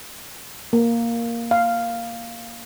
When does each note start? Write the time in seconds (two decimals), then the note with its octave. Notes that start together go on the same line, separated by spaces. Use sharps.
0.73 A#3
1.51 F5